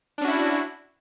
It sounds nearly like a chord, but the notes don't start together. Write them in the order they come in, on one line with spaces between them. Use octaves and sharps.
D4 C#4 F#4 E4